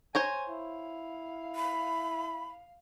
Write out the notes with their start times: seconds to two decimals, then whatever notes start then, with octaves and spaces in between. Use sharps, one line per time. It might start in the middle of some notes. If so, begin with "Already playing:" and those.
0.15 C5 C#5 G#5 A#5
0.49 E4 F5
1.56 B5